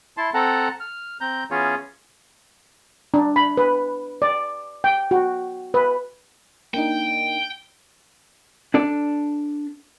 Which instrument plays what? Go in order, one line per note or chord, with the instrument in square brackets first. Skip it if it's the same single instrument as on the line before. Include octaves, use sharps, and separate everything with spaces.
[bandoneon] E4 A5 C6
C4 A4 F#5 A5 A#5
F6
C4 A#5 G6
E3 B3 C#4 F4 G#4 C#5
[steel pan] D4
B5
B4
D5
G5
F#4
B4
[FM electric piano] A#3 D4 D#4 [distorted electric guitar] G5
[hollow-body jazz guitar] D4 A4 D5